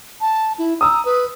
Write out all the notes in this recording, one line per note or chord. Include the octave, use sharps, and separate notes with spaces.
A5
E4
A#5 D#6 E6
B4